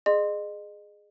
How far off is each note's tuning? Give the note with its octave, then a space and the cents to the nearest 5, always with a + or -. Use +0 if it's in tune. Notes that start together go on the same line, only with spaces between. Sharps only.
G#4 +5 D#5 -35 C6 +0